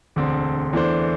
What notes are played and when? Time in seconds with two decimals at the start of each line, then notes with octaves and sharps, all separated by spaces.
0.16 E1 D2 D3 C4
0.73 E2 E3 A3 D4 C5